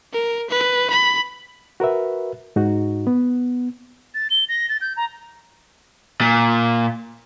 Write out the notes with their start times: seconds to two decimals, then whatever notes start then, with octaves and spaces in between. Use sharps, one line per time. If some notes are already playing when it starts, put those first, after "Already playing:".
0.13 A#4
0.50 B4
0.90 B5
1.80 F#4 A#4 B4 E5
2.56 G#2 D#4 F#4
3.07 B3
4.14 A6
4.30 G7
4.49 A#6
4.69 A6
4.81 G6
4.97 A#5
6.21 A#2